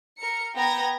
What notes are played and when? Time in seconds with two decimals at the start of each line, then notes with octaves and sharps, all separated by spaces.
0.20 A#4 C#7
0.55 B3 G5 A#5 G#6 A#6